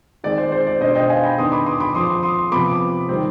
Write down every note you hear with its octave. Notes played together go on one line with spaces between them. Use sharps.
D#3 G#3 C4 D5
C5
C5
D5
B2 B3 D4 C5 D#5
D#5 G5
F5 G#5
G5 B5
D#3 B3 D4 C6 D#6
B5 D6
C6 D#6
B5 D6
F3 C4 C6 D#6
C6 D#6
C3 F3 B3 B5 D6
D#3 G3 C4